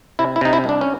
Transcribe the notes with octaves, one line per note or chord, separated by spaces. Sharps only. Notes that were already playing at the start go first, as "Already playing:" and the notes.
C3 E4
E4
C3 D#4
E4
C2
D4
C#4